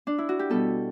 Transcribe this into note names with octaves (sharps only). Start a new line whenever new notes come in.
D4
E4
F#4
G4
B2 G3 B3 A4